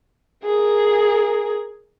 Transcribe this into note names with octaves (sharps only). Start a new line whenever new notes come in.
G#4 A#4